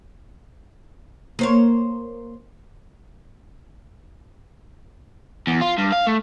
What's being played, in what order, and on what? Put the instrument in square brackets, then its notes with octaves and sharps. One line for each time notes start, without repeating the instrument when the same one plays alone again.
[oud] A#3 C5 C#5
[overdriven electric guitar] E2
F4
G2
F5
A3